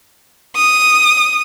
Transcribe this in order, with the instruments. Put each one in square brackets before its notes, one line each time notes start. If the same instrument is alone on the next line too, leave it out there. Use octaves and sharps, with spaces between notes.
[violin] D#6